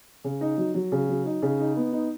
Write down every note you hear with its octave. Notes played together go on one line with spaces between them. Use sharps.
C#3
D#4
F#3
F#3
C#3
F#3
D#4
C#3
D#4
B3
D#4